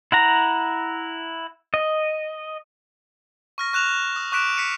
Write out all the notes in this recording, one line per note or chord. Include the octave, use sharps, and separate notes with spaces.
E4 F#5 A#5
D#5
C#6 F6 A#6
C#6 F#6 E7 F7
D#6
C#6 D6 F#6 B6 D7 E7
B6 C#7 D#7